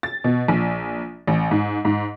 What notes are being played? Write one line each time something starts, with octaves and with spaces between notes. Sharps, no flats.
A6
B2
A#1
A1
G#2
G#2